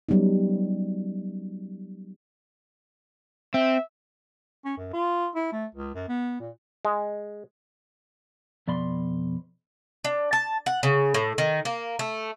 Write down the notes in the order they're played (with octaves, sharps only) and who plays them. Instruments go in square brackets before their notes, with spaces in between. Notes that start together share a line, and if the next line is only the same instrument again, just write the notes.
[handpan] F#3 G3 B3 C#4 D#4
[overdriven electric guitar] C4 [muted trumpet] E5
[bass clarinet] C#4
F#2
F4
E4
A3
C#2
F#2
B3
A#2
[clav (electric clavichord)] G#3
[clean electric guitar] F2 B2 D5 B5 C6
[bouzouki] D4
A5
F#5
C#3
A2
D#3
A#3
A3